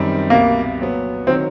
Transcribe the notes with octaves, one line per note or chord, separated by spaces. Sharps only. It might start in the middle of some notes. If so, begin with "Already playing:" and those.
Already playing: F#2 D#3 G3 C4
C2 B2 G3 A#3
A#2 F#3 B3
D#3 F#3 C4